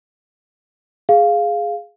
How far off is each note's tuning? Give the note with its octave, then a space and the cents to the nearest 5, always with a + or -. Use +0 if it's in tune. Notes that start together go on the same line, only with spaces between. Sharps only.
G#4 +0 F5 +0